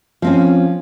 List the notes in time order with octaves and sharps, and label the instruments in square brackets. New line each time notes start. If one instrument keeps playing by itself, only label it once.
[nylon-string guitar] F3 C4 C#4